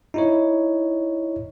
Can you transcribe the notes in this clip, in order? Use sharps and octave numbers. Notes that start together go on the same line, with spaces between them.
D#4 E4 C#5